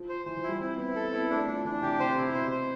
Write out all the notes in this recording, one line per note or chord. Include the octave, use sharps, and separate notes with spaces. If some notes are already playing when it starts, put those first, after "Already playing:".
Already playing: F3
C5
E3 C5
F3
E4
G3
C4 E4
B3 E4
C4 A4
B3 E4
A3 D4
F3 D4
E3 D4
C3 G4
C3 C5
E4
C3
B2 C5
C5